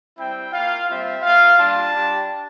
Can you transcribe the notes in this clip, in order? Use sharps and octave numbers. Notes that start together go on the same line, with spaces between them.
G3 C4 E4 G5
A#3 F4 F5
G3 C4 F4 E5
A#3 F4 F5
G3 D4 F4 A5
G3 D4 G4